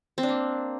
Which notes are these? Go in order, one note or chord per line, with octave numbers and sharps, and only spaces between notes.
C4
D4
A#3